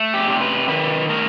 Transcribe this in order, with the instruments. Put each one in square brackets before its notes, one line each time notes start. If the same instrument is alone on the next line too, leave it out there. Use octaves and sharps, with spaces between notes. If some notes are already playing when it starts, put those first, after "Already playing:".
Already playing: [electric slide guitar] A3
G4
C3
B4
D#3 B4
A3 A#4